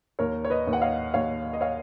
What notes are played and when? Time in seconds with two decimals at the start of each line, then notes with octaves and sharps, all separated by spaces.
0.19 D#2 A#4 C#5
0.45 C#5
0.50 B4 D#5
0.67 D#2
0.73 F#5
0.82 C#5 F5
1.14 D#2 C#5 F5
1.53 D#5
1.61 C#5 F5